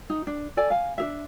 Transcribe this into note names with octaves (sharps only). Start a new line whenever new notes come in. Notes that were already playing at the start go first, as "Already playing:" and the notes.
D#4
D4
A4 D5 G#5
F5 G#5
D4 G#4 E5